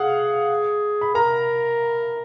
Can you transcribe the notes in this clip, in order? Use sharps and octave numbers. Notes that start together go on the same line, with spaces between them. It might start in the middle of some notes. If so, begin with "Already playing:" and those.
Already playing: G#4 F5 F#5
B5
A#4 A#5